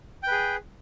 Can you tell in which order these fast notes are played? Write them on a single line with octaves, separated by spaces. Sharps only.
G5 B4 G#4